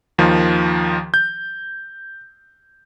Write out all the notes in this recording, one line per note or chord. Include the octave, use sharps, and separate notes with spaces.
D#2 D#3 F3
G6